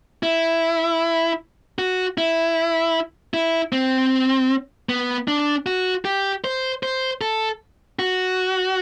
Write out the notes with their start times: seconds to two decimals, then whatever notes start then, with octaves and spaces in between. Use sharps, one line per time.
0.23 E4
1.79 F#4
2.18 E4
3.34 E4
3.72 C4
4.89 B3
5.28 D4
5.66 F#4
6.05 G4
6.44 C5
6.83 C5
7.21 A4
7.99 F#4